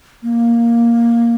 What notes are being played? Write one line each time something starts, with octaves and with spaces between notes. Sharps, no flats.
A#3